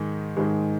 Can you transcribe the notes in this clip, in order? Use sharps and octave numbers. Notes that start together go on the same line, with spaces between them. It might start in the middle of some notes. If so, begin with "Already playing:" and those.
Already playing: G#2 D#3 G#3
G#2 D#3 G#3